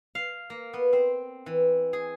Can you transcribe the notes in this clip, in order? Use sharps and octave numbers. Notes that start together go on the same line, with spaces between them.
F5
A#3
B3
C4
E3
G#4